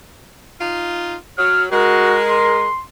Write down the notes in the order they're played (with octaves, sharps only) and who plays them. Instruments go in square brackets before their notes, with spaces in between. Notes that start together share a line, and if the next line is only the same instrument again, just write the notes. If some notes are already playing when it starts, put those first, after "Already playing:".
[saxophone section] D#4 F4
[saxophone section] F#3 [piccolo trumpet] F6
[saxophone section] G#3 [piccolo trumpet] F#4 [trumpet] A#4
[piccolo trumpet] C6